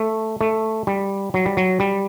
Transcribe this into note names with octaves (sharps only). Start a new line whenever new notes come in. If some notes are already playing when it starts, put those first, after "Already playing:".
Already playing: A3
A3
G3
F#3
G3
F#3
G3